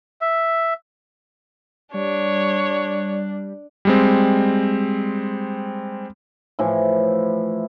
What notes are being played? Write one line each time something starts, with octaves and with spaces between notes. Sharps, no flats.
E5
G3 D4 C#5
G3 G#3 C4
A2 E3 F3 E4